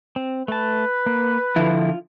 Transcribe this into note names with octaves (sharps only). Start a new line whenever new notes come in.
C4
A3 B4 A5
A#3
D3 F3 E4 F4